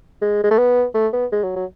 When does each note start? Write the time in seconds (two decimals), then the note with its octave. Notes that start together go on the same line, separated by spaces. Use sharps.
0.22 G#3
0.43 G#3
0.51 A3
0.59 B3
0.95 A3
1.13 B3
1.32 G#3
1.43 F#3
1.56 F#3